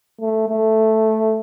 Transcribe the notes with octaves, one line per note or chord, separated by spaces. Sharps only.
A3
A3